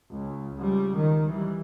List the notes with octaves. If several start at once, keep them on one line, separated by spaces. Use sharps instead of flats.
C#2
C#2 G3
D#3
E3 G3